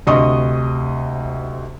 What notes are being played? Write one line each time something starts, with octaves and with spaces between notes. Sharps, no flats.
D2 C3 D#5 C6 C#6 D#6